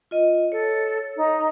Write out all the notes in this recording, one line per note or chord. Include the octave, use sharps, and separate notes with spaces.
F4 D#5
A4 C#5
D#4